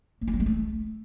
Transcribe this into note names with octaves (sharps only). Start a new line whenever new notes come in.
A#3
E4
F#3
G#3
A3